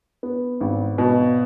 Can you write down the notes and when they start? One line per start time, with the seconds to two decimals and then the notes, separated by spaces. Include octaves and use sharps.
0.23 B3
0.61 G#1
0.98 B2